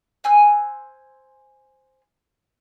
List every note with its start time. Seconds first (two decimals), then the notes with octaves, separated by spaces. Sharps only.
0.24 C5 G#5 E6 F#6